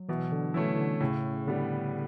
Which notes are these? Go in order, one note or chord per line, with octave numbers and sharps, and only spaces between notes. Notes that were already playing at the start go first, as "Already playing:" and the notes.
Already playing: F#3
B2 E3
D3
E3 A3 C#4 E4
E3
D3
A2 C#3
D3 G3 B3